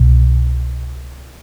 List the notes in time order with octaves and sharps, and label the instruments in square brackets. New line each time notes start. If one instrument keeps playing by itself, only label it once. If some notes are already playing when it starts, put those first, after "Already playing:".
Already playing: [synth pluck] C2 B2